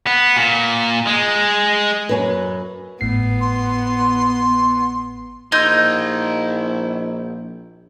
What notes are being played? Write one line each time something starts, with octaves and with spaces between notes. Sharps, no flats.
B3
A#2
G#3
F#2 C#4 B4
G#1 A2 B3 C7
C6
A#1 D#4 E4 C6 E6 G6 G#6